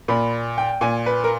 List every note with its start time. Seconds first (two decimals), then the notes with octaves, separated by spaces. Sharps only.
0.08 A#2 B5
0.58 G5
0.81 A#2 G#5
1.06 B4
1.24 A#4